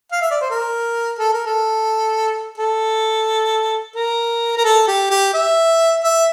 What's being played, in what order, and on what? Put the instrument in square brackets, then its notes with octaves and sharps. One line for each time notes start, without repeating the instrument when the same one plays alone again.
[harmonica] F5
E5
D5
C5
A#4
A4
A#4
A4
A4
A#4
A#4
A4
G4
G4
E5
E5